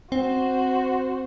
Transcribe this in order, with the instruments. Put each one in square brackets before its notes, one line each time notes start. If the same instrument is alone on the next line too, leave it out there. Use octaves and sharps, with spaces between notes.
[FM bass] C4 [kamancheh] F#4 C5